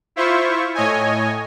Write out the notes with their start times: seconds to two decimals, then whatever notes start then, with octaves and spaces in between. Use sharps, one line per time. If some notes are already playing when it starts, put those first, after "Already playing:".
0.16 E4 F4 C5 E5 C#6
0.75 A2 C#5 D#5 G#5